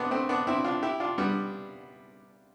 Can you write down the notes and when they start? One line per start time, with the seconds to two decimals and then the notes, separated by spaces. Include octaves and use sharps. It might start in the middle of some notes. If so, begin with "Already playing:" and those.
Already playing: B3 C4 D4
0.11 A3 C4
0.29 B3 D4
0.47 C4 E4
0.64 D4 F4
0.82 E4 G4
1.00 D4 F4
1.18 G3 B3